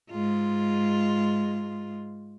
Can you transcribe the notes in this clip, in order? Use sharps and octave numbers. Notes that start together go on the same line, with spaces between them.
G#2 G#3 F4